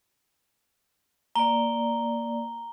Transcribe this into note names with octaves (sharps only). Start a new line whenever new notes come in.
A#3 D5 A#5 G7